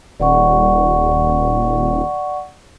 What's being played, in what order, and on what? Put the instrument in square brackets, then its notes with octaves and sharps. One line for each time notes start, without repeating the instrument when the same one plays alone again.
[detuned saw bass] D#1 [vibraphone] D5 F#5 C#6